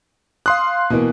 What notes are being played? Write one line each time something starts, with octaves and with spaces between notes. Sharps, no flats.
F5 C6 D#6 F#6
B2 E3 A#3